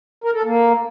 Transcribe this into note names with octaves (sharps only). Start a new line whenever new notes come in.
A#4
A4
A#3